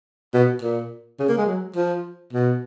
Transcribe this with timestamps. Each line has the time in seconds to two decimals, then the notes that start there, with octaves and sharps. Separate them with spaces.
0.34 B2
0.62 A#2
1.19 C#3
1.29 A#3
1.38 G#3
1.47 F#3
1.76 F3
2.33 B2